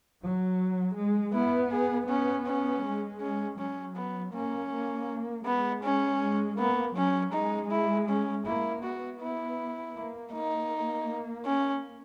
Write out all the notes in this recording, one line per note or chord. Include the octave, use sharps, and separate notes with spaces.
F#3
G#3
B3 E4
G#4
B3 C#4
C#4
G#3
C#4
F#3 C#4
B3
A#3 C#4
A#3
G#3 B3
C#4
G#3
A#3 B3
F#3 C#4
G#3 D#4
E4
C#4
A#3 E4
B3 F#4
E4
A#3
A#3 D#4
C#4